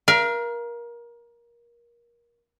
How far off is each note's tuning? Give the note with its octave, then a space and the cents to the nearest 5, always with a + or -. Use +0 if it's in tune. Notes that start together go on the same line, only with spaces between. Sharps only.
A#4 +25 F5 -30